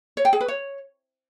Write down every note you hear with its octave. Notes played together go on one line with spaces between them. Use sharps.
C#5
G5
G#4
B4
C#5